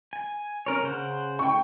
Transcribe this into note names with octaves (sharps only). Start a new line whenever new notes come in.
G#5
C#4 A#4 C#5
C#3 C5 F#5
G5 C#6